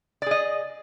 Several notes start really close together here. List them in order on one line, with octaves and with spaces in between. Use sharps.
D5 G#4 D#5